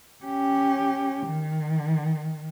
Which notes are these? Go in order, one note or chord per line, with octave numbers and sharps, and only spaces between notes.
C#4 G4
D#3